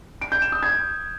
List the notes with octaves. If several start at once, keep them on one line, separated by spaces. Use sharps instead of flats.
D7
G6
E7
D#6
G#6